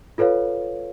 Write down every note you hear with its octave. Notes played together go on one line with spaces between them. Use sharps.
F4 A4 B4 C#5 F5